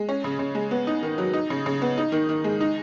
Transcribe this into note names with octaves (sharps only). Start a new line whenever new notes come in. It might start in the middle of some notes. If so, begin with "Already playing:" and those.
Already playing: G#3
C#4
C#3
C#3
G#3
B3
D#4
D#3
F#3
D#4
C#3
C#3
B3
D#4
D#3
D#3
G#3
D#4